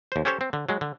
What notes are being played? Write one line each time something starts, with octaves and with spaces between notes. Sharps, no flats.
D#2 C5
C#4 G4 A4 C5 C#5
C4
D3
F#3 G#3
D3